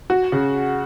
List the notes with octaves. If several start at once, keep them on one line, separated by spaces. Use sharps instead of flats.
F#4
C#3